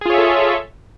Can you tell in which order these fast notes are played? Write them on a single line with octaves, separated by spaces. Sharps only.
G#4 F4 C#5 E5 A4